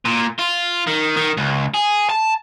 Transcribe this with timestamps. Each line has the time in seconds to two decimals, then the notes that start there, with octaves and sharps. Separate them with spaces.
0.05 A#2
0.39 F4
0.87 D#3
1.16 D#3
1.37 C#2
1.74 G#4
2.09 A5